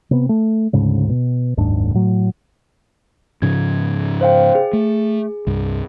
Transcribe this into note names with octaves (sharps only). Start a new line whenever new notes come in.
C3 B3
A3
D2 G#2 C#3
B2
F#1 D#2 G#2 D4
A2 F#3
G#2 C#3 F3 G#6
C5 F5 G5
G#4
A3
C2 G2